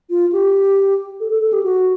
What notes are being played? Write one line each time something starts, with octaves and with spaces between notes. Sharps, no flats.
F4
G4
A4
A4
A4
G4
F#4